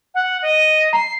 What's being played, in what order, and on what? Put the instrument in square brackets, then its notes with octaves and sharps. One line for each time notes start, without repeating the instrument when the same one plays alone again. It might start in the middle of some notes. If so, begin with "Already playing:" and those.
[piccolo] F#5
D#5
[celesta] A#5 [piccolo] C7